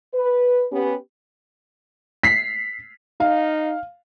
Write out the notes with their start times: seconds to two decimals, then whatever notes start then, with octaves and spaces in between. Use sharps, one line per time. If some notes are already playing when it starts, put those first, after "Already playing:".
0.13 B4
0.71 B3 C#4 G4
2.23 B6 C7
3.20 D#4 F5